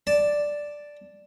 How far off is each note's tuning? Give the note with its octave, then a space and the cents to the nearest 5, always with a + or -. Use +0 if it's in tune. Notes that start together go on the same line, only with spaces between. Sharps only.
D5 +0 A5 +0